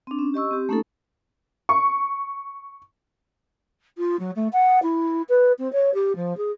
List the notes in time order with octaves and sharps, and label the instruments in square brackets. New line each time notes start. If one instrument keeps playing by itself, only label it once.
[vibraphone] C4 D4
C#4
G4 D#5 C#6 E6
C4 G4
A3 A#3 C#4 D#4 F4 A4
[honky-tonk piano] C#6
[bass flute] F4
F#3
A3
F#5
E4
B4
C4
C#5
G4
F3
G#4